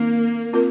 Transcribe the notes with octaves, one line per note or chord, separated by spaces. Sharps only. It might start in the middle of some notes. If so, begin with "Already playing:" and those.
Already playing: D#3 A#3 C4 D#4
C4 F4 A#4